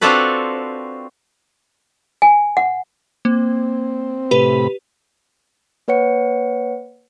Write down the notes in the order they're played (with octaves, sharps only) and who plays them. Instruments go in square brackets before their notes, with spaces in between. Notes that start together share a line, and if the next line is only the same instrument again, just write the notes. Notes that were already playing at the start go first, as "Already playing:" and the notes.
[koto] C4 D4 F4 F#4 A4 B4
[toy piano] G#5
F#5
[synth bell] A#3 [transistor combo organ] C4
[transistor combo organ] A2 C3 B5 [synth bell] G4 B4
[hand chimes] A#3 B4 C#5 F#5 C#7